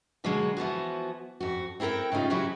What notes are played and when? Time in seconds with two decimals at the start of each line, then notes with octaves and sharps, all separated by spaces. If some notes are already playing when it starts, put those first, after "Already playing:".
0.24 B2 D3 F#3 G#3 A#3
0.57 E3 F3 B3 F#4
1.40 F2 F#4
1.80 C4 E4 A4 A#4 G5
2.12 A2 C#3 G3 D#4 F4
2.30 C#3 E3 F#3 E4 F#4 G4